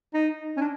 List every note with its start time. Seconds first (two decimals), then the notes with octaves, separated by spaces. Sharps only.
0.14 D#4
0.57 C#4
0.61 D4